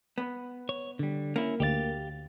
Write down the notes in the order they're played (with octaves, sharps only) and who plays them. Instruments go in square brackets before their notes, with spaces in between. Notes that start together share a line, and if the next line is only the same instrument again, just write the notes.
[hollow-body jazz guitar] B3
[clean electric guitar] C#5
D3 G3
[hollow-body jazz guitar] A#3 [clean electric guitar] C#4 E4
[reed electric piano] D2 A6 [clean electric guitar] G4 D5 F5